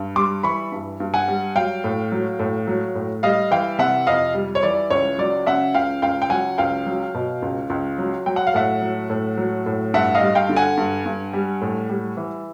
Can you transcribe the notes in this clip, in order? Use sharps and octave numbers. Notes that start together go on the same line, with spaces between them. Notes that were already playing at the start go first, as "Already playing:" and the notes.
Already playing: G2
G3 C6 D6
E3 B5 C#6
G2
G2
F#5 G#5
G3
F#3 F5 G5
A2
F#3
A2
F#3
A2
G3 D#5 F5
E3 F5 G5
C3 E5 F#5
F2 D#5 F5
G3
C#5
E3 D5
C#2 C#5
F#3 D5
C#3 E5 F#5
C#2 F5 G5
C#2 F5 G5
G5
F#3 F#5 G#5
C#2 F5 G5
F#3
B2
C#2
C#2
F#3
F#3 G5
F#5
F5
A2 E5 F#5
F#3
A2
F#3
A2
G2 E5 F#5
D#5 F5
G3
F5 G5
D3
F#5 G#5
G2
G2
G3
A2
G3
E3